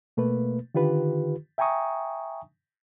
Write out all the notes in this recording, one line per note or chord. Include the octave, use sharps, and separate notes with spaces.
B2 A3 A#3 B4
D3 D#3 F4 G4 B4
E5 G5 G#5 A#5 C#6 D#6